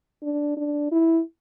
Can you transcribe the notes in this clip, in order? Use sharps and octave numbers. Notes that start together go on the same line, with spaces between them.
D4
D4
E4